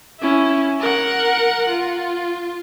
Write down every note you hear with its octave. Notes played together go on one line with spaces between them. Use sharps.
C#4 E4
A#4 F#5
F4